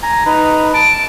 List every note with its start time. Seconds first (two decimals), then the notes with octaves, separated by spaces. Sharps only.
0.03 G#5 A#5
0.26 D#4 B4 A#5
0.74 A5 D7